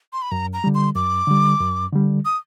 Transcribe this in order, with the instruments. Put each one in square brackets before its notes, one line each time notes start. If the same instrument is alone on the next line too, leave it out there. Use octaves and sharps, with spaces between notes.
[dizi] C6
B5
[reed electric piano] F#2 [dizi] A#5
[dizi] A#5
[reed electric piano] D3 G3
[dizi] C6
[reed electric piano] F#2 [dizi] D6
[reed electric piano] D3 G3
F#2
D3 G3
[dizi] D#6